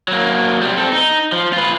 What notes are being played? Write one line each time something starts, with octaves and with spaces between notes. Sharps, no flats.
F#3 A#3
C3 G3
C4 A4
D#4
F3
F4 B4